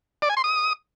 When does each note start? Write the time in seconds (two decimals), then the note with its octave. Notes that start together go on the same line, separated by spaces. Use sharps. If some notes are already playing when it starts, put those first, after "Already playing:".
0.22 D5
0.29 G#5
0.37 C6
0.44 D#6